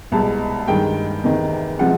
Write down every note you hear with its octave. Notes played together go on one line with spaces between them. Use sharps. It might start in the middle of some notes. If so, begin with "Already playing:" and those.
C2 B2 G#3 A5
G2 D#3 G#3 G5
E2 C3 D#3
C3 F3 G#3 F#5